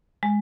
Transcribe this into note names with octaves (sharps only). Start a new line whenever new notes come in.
G#3